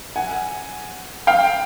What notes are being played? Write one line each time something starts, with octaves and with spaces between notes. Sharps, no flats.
F#5 G#5
F5 G5